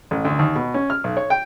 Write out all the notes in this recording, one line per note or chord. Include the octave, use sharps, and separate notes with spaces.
A1
D2
D#2
B2
C#4
F6
B1
C#5
G5